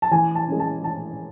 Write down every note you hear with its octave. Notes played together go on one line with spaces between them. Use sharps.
A5
E3 G#5
A5
G#3 C#4
A5
E3 A5